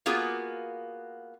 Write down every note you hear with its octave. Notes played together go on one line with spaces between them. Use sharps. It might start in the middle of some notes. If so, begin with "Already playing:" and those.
A#3 B3 F4 F#4 G#4